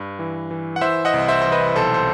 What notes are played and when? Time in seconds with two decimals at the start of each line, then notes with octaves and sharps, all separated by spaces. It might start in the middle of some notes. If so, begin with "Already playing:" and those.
Already playing: G2
0.19 E3
0.51 E3
0.76 F#5
0.81 E3 C5 E5
1.05 D#5 F#5
1.14 C2
1.28 C5 E5
1.42 E3 C5
1.52 B4 D#5
1.76 B1 A4 C5
1.94 C5